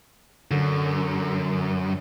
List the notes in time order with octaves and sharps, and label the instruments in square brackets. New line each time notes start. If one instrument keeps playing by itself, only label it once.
[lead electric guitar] F#2 [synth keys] D3